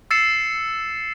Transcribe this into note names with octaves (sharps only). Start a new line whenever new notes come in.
E6 A6 C7 C#7 E7